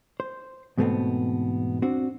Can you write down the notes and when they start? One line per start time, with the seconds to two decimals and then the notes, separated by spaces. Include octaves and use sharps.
0.20 C5
0.78 E2 G#2 B2 A3 B3 C4
1.82 C4 D4 F#4